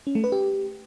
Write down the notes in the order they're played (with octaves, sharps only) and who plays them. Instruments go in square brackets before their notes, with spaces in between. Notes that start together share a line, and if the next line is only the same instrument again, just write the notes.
[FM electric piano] C#4
A3
B4
G4